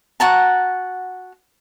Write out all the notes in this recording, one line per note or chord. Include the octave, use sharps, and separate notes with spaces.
F#4 F#5 A5 A#5